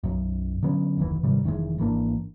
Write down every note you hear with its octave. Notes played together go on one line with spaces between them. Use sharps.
B1 F#2
D3 F#3 B3 C#4
F1 D2 D#3 E3
G#2 C3 D#3 G3
F1 D#3 E3 G#3
G#1 E3 A#3 D4